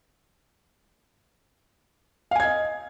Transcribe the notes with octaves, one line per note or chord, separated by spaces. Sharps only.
D#5 F5 G#5 G#6